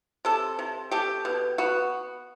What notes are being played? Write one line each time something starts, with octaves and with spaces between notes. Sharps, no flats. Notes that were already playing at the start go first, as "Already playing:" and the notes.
C3 A4
C3
A3 G4
B2
B3 F#4